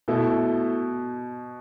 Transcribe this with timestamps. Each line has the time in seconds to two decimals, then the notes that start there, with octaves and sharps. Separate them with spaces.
0.08 B2 A3 E4 A4